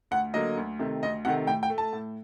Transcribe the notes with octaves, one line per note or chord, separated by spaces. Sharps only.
D2 F#5
D3 F#3 A#3 D#5
D2
C3 D#3 A3
D2 D#5
C3 D#3 A3 F#5
A2 G5
G5
A3
A5
A2